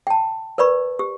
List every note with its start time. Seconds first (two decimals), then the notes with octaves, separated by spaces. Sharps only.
0.07 G5 A5
0.58 A#4 B4 D5 B5 C#6
0.99 G4